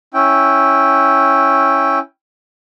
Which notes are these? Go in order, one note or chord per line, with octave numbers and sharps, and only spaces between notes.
C#4 E4 G5